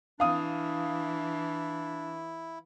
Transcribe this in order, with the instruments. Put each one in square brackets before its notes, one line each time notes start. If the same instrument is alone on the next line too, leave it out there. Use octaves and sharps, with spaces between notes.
[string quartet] E3 [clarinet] D4 [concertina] E4 [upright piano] F5 D#6